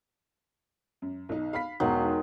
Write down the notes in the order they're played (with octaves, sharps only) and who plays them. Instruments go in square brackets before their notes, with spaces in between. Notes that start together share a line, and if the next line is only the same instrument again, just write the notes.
[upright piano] F#2
B1 D#4
F5 B5 B6
[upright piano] E1 B1 E2 [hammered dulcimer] D#3 F#3 G#3